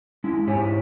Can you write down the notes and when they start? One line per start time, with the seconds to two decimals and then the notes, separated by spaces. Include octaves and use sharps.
0.24 G#3 C#4 E4
0.47 G#2 E4 G4 C5 C#5 G#5